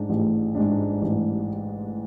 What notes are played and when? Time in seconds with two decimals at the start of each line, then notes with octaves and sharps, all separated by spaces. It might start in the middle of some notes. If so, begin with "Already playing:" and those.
Already playing: G#2 G#3 D4
0.10 A1
0.55 G#2 G#3 D4
1.02 A1